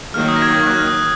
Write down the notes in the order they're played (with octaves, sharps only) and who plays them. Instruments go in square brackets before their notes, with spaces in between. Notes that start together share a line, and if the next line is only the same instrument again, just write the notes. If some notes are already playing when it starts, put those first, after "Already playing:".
[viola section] D#3 F#3 A#3 [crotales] F6
[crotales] D#6
A#6
G#6
F#6
F6
D#6